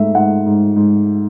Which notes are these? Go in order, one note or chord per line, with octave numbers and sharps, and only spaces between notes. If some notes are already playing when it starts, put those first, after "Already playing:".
Already playing: G#2 A3 E5
G#2 F#5
G#2
G#2